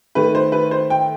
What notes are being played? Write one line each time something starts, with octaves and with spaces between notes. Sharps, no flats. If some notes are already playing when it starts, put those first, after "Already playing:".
D#3 A3 B4
C5
B4
C5
G5